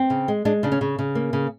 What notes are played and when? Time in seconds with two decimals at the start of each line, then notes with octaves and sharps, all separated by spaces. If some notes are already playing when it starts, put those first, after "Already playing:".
Already playing: C4
0.10 C#3
0.28 G#3
0.45 G#3 D4
0.63 C#3 D4
0.72 C#4
0.81 C#3
0.99 C#3
1.15 A#3
1.33 C#3